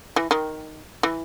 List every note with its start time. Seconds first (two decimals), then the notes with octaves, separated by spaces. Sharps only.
0.16 E3
0.31 D#3
1.03 E3